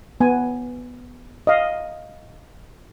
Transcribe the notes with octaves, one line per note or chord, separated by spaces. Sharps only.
B3 G#5
D#5 F5